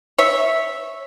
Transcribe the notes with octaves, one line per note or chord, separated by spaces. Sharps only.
C#5 E5